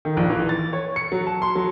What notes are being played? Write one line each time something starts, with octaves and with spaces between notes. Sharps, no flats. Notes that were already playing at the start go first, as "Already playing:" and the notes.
D#3
A#1
E3
A6
C#5
C#7
F#3
A5
C6
F#3